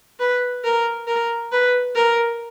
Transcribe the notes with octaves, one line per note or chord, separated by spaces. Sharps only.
B4
A#4
A#4
B4
A#4